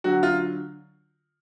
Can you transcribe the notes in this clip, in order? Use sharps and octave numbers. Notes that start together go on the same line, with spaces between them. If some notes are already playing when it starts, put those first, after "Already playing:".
D3 F#3 F#4
F4